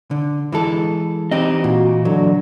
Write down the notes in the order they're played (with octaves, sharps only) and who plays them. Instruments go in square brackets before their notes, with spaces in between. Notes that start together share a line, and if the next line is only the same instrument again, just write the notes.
[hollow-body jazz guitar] D3
E3 G#3 A4
[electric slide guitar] E3 D#5 [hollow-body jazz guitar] C4 D#4 G4
[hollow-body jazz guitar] A#2 [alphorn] F#4
[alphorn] D3 [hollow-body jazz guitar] F#3